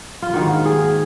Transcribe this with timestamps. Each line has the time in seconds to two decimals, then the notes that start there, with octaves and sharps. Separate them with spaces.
0.22 F4
0.33 G#2 D#3 A#3 F#4
0.65 G#4